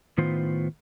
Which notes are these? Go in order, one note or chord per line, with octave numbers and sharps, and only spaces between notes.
A2 D#3 B3 F4 C5